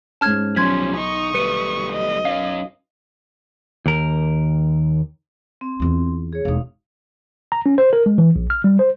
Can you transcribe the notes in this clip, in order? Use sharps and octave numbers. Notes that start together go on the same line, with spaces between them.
G#2 C#4 A5 F6 G#6
B1 F3 G3 C#4 C6 G#6 B6
D#4 C#6 D#6
G3 A3 B4 C#7 D#7
D#5
F#3 C#4 F5
D#2 A#4
C4
E2 F4
G#4 C#5
E1 D#4 F5 D#6
A#5
C#4
C5
A#4
G#3
E3
A#1
F6
G3
C5